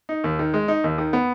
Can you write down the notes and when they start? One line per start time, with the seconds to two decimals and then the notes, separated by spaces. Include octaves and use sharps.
0.09 D#4
0.24 D#2
0.39 D#3
0.54 G#3
0.68 D#4
0.84 D#2
0.98 D#3
1.13 B3